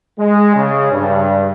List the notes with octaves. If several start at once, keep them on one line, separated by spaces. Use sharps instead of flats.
G#3
C#3
G2